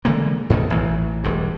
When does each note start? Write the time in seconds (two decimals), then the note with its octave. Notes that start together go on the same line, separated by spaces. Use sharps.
0.05 D3 E3 G#3 A#3
0.50 G#2 B2 D#3 A3
0.70 A1 E3
1.24 E1 G2